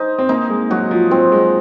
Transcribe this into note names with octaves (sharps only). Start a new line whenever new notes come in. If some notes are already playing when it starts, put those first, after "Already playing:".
Already playing: D#4 C5
C4
A#3 D#4
G#3
F#3 F#4
F3
F#3 C4
G#3